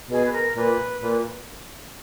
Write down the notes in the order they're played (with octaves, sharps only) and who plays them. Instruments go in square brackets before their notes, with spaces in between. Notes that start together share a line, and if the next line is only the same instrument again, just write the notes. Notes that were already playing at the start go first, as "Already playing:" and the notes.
[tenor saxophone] B2 [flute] G#4
[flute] B4
A#4
[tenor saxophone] A#2 [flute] B4
[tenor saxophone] A#2